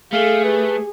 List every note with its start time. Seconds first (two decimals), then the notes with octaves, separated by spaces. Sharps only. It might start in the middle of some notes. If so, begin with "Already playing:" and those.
0.13 A3 G#4 A4 F5
0.44 G4 B4